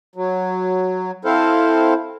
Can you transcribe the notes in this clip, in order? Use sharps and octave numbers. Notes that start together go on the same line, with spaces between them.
F#3
C4 E4 A4 C5 F5